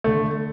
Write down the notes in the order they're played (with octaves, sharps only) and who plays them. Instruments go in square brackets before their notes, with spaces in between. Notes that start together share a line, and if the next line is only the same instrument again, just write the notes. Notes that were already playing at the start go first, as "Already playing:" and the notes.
[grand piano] D3 A3